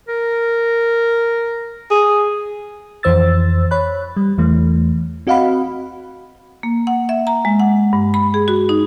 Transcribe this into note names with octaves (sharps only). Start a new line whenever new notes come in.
A#4
G#4
F2 E3 C5 E6 A6
C#5 B5 F#6
G3
E2 E3 A3
C4 F#4 D#5 F5 F#5 B5
A#3
F#5
E5
A#5
G#3
F#5
G2
B5
G#4
F#4
D#4